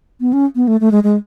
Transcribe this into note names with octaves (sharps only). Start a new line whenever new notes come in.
B3
C#4
B3
A3
A3
G#3
G#3